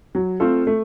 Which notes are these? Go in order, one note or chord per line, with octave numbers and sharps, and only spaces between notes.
F#3
A3 C4 F4 A4
A3